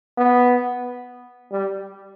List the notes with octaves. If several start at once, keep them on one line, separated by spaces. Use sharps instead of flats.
B3
G3